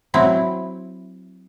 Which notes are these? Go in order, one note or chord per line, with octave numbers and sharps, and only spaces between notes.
F#3 C4 E4